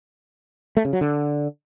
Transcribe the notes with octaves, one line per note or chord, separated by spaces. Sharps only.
A3
C#3
F#3
D3